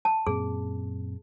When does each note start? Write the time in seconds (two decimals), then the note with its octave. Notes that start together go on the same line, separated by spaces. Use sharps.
0.05 A5
0.27 F#2 A#2 C4 G#4